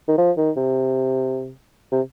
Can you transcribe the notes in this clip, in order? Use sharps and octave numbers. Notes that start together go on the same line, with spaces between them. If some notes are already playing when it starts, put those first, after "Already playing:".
D#3
F3
D#3
C3
C3